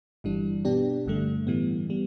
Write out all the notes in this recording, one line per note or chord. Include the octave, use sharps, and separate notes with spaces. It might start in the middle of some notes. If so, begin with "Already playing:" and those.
G1 G2 E3 G3 D4
B2 B3 D4 G4
G1 G2 D3 A3
A2 E3 G3 B3
G3 B3